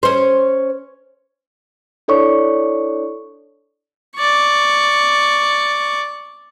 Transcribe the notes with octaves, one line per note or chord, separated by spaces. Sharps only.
C#4 C5
D4 E4 A4 C#5 D5 C#6
D5 C#6